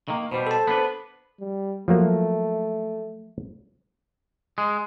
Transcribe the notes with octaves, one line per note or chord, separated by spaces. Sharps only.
D#3 A#3
B2 G3 C5
A4 A5
B3 D4 B4
G3
F3 F#3 A3 A#3
G#3